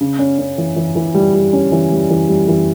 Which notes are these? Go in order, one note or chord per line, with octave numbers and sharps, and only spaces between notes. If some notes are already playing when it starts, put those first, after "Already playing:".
C#3
C#4
C#4
E3
E3
E3
G3
G3
C#4
E3
G3
E3
G3
E3